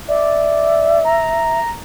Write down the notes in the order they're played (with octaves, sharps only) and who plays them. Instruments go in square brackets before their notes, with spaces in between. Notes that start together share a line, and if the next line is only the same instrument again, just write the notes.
[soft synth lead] D5 [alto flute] E5
[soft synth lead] A#5